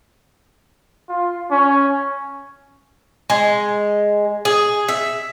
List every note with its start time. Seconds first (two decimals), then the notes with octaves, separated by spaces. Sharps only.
1.09 F4
1.51 C#4
3.30 G#3
4.45 G#4
4.88 E5